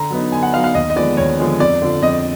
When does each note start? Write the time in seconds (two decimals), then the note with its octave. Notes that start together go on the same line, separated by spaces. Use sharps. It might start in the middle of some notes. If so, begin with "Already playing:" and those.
Already playing: D3 A#5
0.10 F#3 B3 D#4
0.32 D3 G#5
0.43 F#5
0.53 F#3 B3 D#4 F5
0.64 F5
0.75 D#2 D#5
0.90 D#5
0.96 D3 F3 G#3 B3 D5
1.17 D#2 C#5
1.38 D3 F3 G#3 B3
1.60 F2 D5
1.82 D3 F3
2.02 F2 D#5